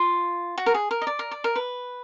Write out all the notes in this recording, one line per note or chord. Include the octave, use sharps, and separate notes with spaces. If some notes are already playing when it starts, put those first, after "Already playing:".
Already playing: F4
F#4
A#4
G#4
A#4
D#5
D5
A#4
D5
A#4
B4